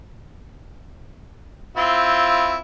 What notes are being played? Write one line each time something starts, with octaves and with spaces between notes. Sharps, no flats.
C4 E4 F4